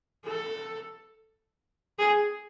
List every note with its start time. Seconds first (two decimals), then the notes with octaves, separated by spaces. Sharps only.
0.25 A4
1.99 G#4